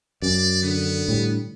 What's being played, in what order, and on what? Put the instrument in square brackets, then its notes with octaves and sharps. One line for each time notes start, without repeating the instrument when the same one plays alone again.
[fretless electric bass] F#2 [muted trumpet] D5
[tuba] D3 [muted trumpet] B3
[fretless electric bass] A2 G3